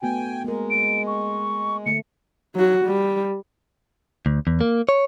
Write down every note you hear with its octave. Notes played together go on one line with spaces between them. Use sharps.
A3 B3 F#4 G5 G#5
G#3 A#3 A#4
D7
C#6
D3 A3 C#7
F#3 F#4
G3
D2
E2
A#3
C#5